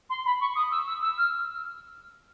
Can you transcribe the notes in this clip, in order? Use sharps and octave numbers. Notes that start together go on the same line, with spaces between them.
C6
B5
C#6
D#6
E6
E6
E6
F6